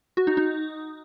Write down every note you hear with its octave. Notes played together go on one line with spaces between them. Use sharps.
F#4
D#4
D#4